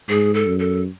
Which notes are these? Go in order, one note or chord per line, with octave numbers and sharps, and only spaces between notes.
G#2 G#4
A4
F#2
A4